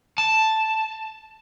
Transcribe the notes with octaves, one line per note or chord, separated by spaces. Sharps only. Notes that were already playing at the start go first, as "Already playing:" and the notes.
A5